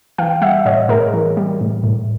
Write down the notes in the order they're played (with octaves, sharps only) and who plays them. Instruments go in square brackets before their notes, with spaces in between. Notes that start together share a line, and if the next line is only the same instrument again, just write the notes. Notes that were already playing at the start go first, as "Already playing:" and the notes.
[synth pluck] E3 F5 G5
G3 E5 F#5
A2 C#5 D#5
A2 G#4 A#4
E3
G3
A2
A2